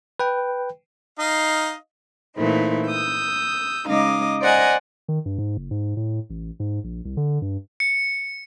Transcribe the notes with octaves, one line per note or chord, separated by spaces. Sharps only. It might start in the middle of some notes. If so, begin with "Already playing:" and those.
B4 G5
D#4 D#5 F5
A#2 E3 A3 C4 D#4
D#6 E6 G6
C#3 G#3 D#4 D#5 F5 D6
C5 D5 D#5 F#5 G#5 A#5
D#3
G2
G#2
F#1
G#2
A2
A1
G#2
A#1
C2
D3
G2
C#7